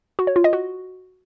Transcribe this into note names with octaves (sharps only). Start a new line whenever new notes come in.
F#4
C#5
F4
D#5
F#4